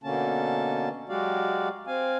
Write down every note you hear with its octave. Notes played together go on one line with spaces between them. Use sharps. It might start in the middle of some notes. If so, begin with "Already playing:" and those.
B2 D3 A#3 C#4 A5
F#3 G#3 F#4 G4 D5 F5
C4 F5 G#5